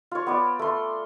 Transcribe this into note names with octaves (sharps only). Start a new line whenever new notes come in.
F4 C#5
B3 F4 D5
A3 C6